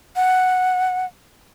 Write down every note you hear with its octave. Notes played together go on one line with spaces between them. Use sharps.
F#5